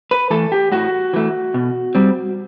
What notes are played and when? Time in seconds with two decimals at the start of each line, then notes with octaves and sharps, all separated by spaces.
0.11 B4
0.30 E3 A3 A4
0.52 G4
0.72 A2 F#4
1.13 E3 A3
1.54 B2
1.95 G3 C4